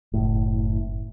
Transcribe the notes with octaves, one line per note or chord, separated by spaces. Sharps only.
F#1 A2